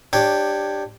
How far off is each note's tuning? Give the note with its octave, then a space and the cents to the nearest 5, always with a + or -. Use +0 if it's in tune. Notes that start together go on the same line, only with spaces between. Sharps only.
D4 +15 G4 +5 C#5 +0